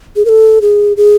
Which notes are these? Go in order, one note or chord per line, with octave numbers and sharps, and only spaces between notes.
G#4
A#4
A4
G#4
G#4